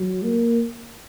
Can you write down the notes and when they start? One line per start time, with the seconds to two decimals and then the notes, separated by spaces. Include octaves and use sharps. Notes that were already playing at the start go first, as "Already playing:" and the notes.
Already playing: F#3
0.23 A#3